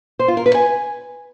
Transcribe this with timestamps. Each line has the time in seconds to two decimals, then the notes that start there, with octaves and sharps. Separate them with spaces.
0.19 C5
0.28 F4
0.37 A#4
0.46 B4
0.54 G#5